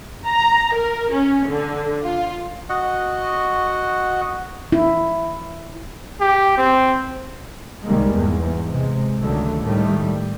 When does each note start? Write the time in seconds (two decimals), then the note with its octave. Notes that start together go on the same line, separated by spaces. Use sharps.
0.26 A#5
0.73 A#4
1.09 C#4
1.47 D3
2.05 F4
2.69 F#4 D#5 F#5
4.72 E4
6.21 G4
6.58 C4
7.85 C2 D#3 G3 G#3 A#3
8.13 E2 G#2
8.68 C3 G#3
9.21 C#2 D3 D#3 F#3 A3
9.64 A2 D#3 G3 A3
9.98 G3